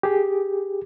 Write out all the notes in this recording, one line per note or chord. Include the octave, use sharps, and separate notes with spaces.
G4 G#4